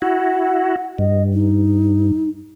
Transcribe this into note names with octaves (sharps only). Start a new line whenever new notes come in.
E4 F#4 F#5
G2 D#5
D#4